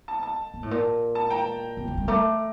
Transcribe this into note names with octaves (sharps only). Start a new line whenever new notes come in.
A5
A5
A#2
A2
A#2
A5
G5 A#5
C3
F3
G3
A3 A#5 D6